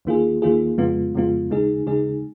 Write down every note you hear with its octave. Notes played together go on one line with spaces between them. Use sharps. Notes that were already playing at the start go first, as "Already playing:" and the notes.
D#2 D#3 A#3 F4 G#4
D#2 D#3 A#3 F4 G#4
F2 C#3 G#3 B3 F4
F2 C#3 G#3 B3 F4
D#2 C#3 G#3 D#4 G#4
D#2 C#3 G#3 D#4 G#4